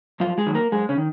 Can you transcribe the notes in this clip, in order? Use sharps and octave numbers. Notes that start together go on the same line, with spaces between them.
F#2 F3 F4
G#3 G#4
D#3 F#3
A#3 A#4
F#2 G#3 G#4
C#3 C#4
D#3